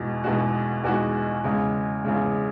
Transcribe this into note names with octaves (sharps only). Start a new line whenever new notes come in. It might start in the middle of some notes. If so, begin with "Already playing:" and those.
Already playing: E2 B2 G#3 D#4 F#4
E2 B2 G#3 D#4 F#4
E2 B2 G#3 D#4 F#4
E2 C#3 G#3
E2 C#3 G#3